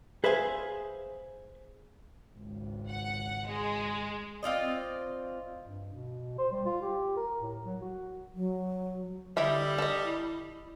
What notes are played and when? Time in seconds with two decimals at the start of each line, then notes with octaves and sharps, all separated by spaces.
0.24 G#4 B4 C5 E5 F5 G#5
2.38 G#1 C#2
2.88 F#5
3.46 G#3
4.43 C4 F4 D5 D#5
5.62 G2
5.93 B2
6.38 C5
6.52 G3
6.66 F4
6.81 G4
7.17 A#4
7.40 A2
7.65 F#3
7.81 F#4
8.35 F#3
9.37 D3 G3 E4 D#5 E5
9.78 A4 D#5
10.04 E4